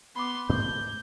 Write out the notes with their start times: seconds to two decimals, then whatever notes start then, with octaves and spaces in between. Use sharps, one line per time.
0.16 B3 B5 C6 D6
0.49 G#2 A3 B3 G6